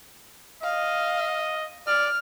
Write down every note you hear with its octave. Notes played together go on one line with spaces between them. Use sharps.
D#5 F5
D5 F6